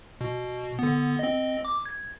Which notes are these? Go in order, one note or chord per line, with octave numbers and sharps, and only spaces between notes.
B2
D3 B3
C4 D#5
D6
G#6